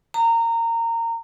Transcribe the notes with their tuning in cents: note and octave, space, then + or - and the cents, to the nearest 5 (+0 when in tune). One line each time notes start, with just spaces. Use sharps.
A#5 -20